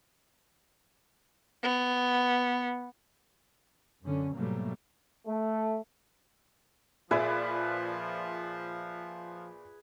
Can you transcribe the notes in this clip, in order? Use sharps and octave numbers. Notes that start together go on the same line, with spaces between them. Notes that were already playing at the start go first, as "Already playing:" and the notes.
B3
F#2 D3 C#4
G#2 B2 F#3 G3 A3 A#3
A3
A#2 F3 G#4 B4 D5 E5